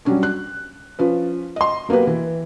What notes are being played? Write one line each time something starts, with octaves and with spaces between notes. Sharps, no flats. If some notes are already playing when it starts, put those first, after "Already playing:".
F#3 G3 C#4 D4
F#6
F3 C#4 B4
D#5 C6
F#3 A#3 B3 G4 B4
E3